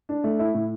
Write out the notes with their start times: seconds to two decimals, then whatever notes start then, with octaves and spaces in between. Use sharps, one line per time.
0.09 D4
0.24 A3
0.39 E4
0.54 A2